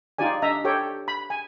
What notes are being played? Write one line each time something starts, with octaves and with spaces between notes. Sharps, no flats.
D#4 F4 G4 D5 G#5
D4 D#5 E5 A#5
G4 A4 C#5 G5
B5
G#5